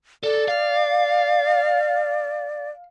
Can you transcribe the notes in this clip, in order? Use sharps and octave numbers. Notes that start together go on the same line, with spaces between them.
A4 D5
F5